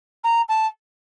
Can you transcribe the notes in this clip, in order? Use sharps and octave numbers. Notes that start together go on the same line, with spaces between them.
A#5
A5